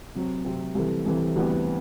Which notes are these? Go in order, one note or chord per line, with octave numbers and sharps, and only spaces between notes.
C3 F#3 C4
C3 F#3 C4
C2 C3 E3 A3
C2 C3 E3 A3
D2 C3 E3 G3 B3